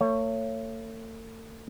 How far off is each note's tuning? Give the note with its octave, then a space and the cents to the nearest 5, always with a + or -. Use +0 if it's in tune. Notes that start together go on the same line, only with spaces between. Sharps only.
A3 +40 C#5 +0